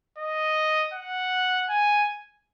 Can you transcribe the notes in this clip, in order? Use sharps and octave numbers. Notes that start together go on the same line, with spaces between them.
D#5
F#5
G#5